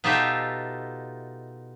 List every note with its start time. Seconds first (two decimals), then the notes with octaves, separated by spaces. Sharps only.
0.04 B2 D#4 F4 G4 A4 E5